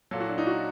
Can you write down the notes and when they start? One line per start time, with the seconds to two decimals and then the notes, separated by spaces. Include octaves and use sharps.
0.11 A#2 F#3 A4
0.20 F#4
0.29 D4
0.38 D#4
0.47 F#4